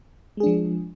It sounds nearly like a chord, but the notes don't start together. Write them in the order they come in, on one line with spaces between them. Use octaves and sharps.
G#3 G#4 D4 F3